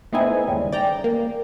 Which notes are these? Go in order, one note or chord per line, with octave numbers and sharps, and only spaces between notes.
A3 B3 C4 D#4 E4 G#5
D#2 G#2 C#3 G3
D5 G5 A#5
A#3